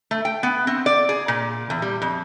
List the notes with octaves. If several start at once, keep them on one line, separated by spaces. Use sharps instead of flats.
A3
G5
B3
C4
D5
G#4
A#2
E2
G3
F2